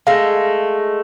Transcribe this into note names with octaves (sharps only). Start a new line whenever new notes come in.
G#3 A3 F5